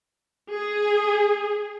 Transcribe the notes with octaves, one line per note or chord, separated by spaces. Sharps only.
G#4